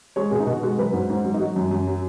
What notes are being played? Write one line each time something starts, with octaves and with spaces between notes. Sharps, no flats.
G#3 C#5
B2 G#4
D#4
B2 F#4
G#3 F#4
F#3 B4
G#2
G#2
F#3
D#4
F#3 F#4
F#2
F#2
F#3